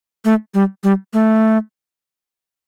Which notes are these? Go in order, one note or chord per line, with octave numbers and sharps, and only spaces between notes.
A3
G3
G3
A3